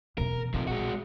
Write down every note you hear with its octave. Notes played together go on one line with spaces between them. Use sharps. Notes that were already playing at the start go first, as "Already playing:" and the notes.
E2 B2 A#4
A#1 C3 F3
G#3 F#4